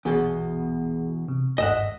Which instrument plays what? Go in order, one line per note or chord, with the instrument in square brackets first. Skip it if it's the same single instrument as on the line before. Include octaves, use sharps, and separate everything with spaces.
[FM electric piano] A#1 F#4 G#4 [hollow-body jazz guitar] E2 B2
[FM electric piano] C3
[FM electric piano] G1 D#2 G#2 [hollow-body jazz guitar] D#5 E5 F#5